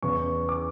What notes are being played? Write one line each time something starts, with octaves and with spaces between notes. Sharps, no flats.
E2 C#3 E3 C#6
D6